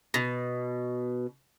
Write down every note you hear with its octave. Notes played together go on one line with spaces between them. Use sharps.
B2